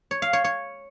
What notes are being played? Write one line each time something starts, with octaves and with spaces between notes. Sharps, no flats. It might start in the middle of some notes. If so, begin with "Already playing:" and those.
C#5
F5
C#5
C#5